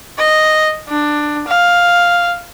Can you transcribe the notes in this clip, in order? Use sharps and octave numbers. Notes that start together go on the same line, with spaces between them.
D#5
D4
F5